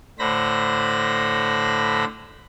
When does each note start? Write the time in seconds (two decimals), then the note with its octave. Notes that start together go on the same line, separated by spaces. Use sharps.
0.19 A2 D3 C5 B5 A#6